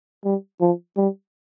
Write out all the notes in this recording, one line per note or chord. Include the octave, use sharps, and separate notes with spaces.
G3
F3
G3